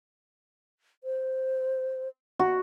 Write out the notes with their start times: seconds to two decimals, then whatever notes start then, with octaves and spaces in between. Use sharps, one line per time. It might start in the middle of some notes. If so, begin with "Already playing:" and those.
1.04 C5
2.39 F#4